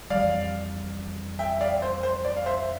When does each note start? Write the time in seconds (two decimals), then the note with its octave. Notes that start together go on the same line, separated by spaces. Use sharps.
0.10 F2 E3 G3 D5 F5
1.39 E5 G5
1.61 D5 F5
1.82 C5
2.03 C5
2.25 D5
2.37 F5
2.46 C5 E5